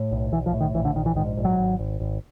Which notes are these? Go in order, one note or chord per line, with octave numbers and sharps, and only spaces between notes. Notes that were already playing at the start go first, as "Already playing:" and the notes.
Already playing: A2
B1
B1 E3
F3
A2
D#3
A#1 E3
D3
A#1 D#3
E3
G#2 D#3
A#1
F#3
G#1
G#1
G#1